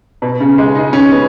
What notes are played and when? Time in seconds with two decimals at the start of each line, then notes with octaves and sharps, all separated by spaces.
0.22 B2
0.40 C#3
0.58 G#3
0.75 D#4
0.93 C#4
1.11 B3